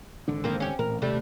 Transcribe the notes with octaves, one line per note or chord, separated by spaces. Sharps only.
G#1 D3 D4
F3 A#3 C4
C#4 G4
A1 A#2 A#4
D#1 C3 G3 A3